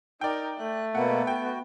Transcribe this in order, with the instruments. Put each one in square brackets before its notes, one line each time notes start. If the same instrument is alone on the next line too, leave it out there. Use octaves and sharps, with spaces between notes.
[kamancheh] D#4 A#4 [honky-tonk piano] D5 G5
[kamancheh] A3 [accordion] F#6
[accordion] B2 A#3 [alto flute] B3 [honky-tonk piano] F#5
[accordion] F#4 [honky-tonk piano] G5